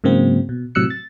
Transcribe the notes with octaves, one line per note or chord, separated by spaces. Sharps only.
G#2 C#3 F#3 A#3 C4
B2
A2 C3 F#3 E6 F#6 C#7
A6